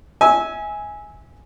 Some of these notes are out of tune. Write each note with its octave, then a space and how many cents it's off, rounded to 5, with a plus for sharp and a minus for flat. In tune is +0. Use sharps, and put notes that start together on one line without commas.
E5 -35 G#5 +0 E6 -15